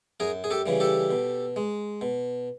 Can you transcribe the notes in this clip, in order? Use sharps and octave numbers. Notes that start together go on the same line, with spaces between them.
F#2 G#4 A#4
G#4
G4 A4
C#3 E3 G3
G4 A4
B2
G#3
B2